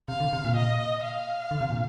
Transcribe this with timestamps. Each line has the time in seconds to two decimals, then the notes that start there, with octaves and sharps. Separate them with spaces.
0.08 C3 F5
0.20 D3
0.33 C3
0.45 A#2
0.56 D#5
1.03 F5
1.51 D3
1.61 C3
1.70 A#2